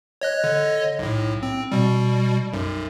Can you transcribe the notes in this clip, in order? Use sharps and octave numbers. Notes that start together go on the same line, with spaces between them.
C#5 D#5 F#6
D3 C#5 D#5
B1 A2
C4
B2 G3
B1 F#2